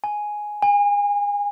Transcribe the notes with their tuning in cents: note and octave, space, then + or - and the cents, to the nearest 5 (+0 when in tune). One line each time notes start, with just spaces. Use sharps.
G#5 +5
G#5 -30